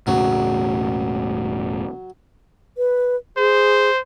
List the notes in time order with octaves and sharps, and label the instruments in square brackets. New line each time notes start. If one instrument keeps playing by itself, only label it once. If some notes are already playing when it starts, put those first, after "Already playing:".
[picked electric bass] E1 A2 C#3 [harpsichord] F#3
[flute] B4
[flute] G#4 [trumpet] C5